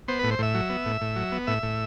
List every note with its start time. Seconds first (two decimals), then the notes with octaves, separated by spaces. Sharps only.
0.08 B3 C5
0.19 A2 B4
0.31 C5
0.39 A2 E5
0.54 F#3
0.70 B3
0.86 A2
1.01 A2
1.16 F#3
1.32 B3
1.47 A2 E5
1.63 A2